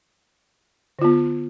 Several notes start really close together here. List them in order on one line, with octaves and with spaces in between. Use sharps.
D3 F4 B3